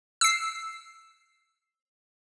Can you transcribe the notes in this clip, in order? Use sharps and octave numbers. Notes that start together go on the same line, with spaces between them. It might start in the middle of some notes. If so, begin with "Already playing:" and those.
E6 C7